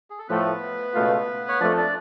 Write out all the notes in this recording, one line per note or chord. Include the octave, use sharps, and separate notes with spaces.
G#4
A4
A2 F3 A3 B3 B4
C#2 B2 A3 F4
C#5
F2 F3 A3 D4 D5
D4 D5